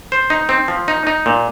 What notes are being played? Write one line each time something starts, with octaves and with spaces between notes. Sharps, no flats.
C5
D#4
C4
F3
D#4
D#4
A#2